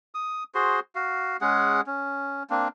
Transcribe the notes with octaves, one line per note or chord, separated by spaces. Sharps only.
D#6
F#4 G#4 C5 C6
F#4 F5
G#3 C#4 G#4 F#5
C#4
A#3 C4 D4